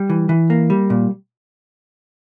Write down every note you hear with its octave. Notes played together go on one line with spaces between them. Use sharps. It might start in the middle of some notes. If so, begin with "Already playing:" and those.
Already playing: G3
E3
E3
A#3
G3
A#2